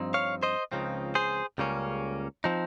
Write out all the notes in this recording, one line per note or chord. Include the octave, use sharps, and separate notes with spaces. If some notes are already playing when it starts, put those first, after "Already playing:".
Already playing: G2 F3 C4 D#4
C#5 F5
C5 D#5
C#2 C#3 F3 C4 D#4
G#4 C5
C#2 C#3 G3 A#3 C#4
F3 C4 D#4